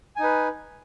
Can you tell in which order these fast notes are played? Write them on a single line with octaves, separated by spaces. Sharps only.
G#5 D#4 B4